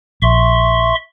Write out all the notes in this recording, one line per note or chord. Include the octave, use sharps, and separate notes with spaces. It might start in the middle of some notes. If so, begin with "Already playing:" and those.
A#1 E5 C6 C#6